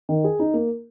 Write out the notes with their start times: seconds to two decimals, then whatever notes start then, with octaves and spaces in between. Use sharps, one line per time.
0.09 D#3
0.24 G#4
0.39 D#4
0.54 A#3